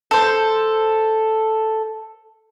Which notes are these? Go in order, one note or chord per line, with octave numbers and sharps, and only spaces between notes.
A4 C5